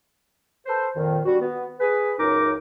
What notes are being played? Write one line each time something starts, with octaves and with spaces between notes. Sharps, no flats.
A4 B4 C5
F2 A#2 D#3
G3 D4 F#4
B3
G#4 B4
C#2 F#2 D#4 A#4 D6